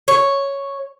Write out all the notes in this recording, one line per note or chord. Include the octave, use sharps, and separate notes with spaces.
C#5